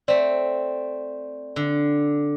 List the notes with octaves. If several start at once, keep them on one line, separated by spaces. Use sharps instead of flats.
A3 C4 D5
D3